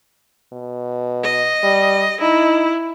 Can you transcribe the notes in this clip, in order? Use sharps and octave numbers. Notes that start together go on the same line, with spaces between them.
B2
D#5
G3
D#4 E4